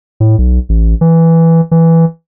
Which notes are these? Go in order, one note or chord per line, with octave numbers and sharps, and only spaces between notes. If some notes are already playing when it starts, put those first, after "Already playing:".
A2
B1
A1
E3
E3